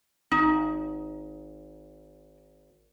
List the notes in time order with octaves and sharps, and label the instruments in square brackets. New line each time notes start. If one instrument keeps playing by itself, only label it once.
[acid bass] G#1 [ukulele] D#4